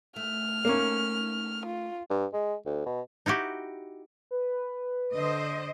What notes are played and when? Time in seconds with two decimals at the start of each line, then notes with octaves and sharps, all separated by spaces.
0.16 A3 F6
0.65 A3 A#3 C#4 D#4
1.66 F4
2.10 G2
2.33 G#3
2.66 D2
2.86 B2
3.26 D#4 E4 F#4 G4
4.31 B4
5.15 D3 C5 D#5